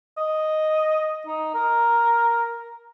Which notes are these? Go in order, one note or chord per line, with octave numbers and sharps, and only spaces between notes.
D#5
D#4
A#4